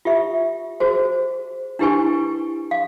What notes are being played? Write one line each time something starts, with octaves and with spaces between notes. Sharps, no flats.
F4 G4 E5
F#4 G#4 C5
D4 E4 G4 B4 G#5 C#6
F5